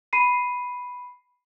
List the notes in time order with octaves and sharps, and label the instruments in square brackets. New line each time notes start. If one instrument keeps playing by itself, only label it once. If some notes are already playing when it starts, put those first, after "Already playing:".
[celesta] B5 C7 D#7